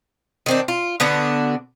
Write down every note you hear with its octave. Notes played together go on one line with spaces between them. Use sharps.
D#3 C4 D4
F4
D3 B3 D4 F#4